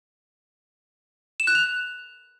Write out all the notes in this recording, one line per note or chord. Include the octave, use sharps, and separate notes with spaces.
E7
F#6
F7